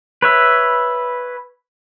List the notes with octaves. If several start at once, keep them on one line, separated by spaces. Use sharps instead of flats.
B4 C#5 E5